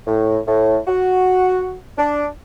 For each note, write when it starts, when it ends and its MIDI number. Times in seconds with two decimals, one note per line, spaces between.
0.07 0.38 45
0.46 0.77 45
0.87 1.74 66
1.98 2.26 62